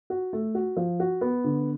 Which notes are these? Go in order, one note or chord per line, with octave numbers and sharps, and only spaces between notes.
F#4
A3
F#4
F3
F#4
B3
D3